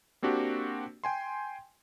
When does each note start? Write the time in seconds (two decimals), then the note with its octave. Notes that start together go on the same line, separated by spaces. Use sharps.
0.22 A#3 C4 D4 F#4 G4
1.04 G5 G#5 C6